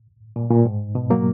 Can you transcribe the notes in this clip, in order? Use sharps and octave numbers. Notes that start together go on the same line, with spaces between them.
A#2
A#2
G#2
B2
F#3 A#3